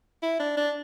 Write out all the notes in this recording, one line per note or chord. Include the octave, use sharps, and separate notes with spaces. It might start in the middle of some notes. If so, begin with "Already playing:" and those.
E4
D4
D4